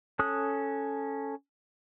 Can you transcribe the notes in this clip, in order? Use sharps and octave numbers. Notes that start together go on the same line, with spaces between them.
C#4 A4 D#6 F#6